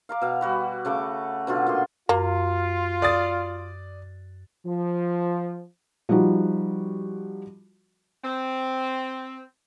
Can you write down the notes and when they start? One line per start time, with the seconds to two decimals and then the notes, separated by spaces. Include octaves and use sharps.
0.09 F5 A#5 D6
0.21 B2 F5
0.41 G3 F#4 B4
0.85 C#3 A3 C#6 D6
1.47 B2 D3 F#3 F4
1.67 A#2 G#4 C6
2.09 F#2 A#3 F4
3.02 D5 D#6 A6
4.65 F3
6.09 F3 G3 D#4 F#4
8.24 C4